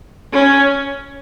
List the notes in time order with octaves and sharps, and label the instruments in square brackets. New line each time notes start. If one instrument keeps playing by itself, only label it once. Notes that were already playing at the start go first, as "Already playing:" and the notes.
[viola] C#4